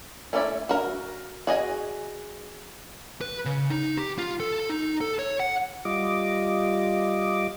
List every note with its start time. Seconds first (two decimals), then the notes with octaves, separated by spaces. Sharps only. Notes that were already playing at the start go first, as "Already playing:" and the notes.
0.33 A3 C#4 E4 D5 E5
0.69 F#4 A#4
1.47 F#4 G#4 D#5 G#5
3.21 B4
3.45 C#3
3.70 D#4
3.97 G4
4.18 F4
4.40 A4
4.70 D#4
5.01 A4
5.19 C#5
5.40 F#5
5.85 G3 F4 D#5 D6